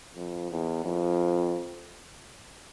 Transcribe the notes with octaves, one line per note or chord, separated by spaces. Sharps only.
F2
E2
F2